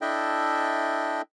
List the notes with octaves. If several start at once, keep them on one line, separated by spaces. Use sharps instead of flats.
D4 E4 A4 D#5 E5 G5